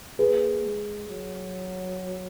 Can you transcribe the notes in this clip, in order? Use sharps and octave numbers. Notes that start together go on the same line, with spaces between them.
A#3 G#4 B4
G#3
F#3